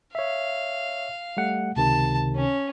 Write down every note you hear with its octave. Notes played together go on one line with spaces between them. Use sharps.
C#5 E5 F5
G3 A3 F#5
C#2 C3 D#3 A5
C#4